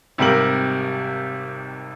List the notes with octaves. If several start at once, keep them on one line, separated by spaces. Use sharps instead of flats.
G#1 C3 G3 A#4 F#7